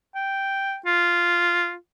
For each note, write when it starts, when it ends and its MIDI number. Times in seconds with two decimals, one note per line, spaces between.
0.15 0.77 79
0.86 1.75 65